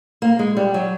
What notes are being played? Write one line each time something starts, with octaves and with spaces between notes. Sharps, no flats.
A#3
G#3
G3
F#3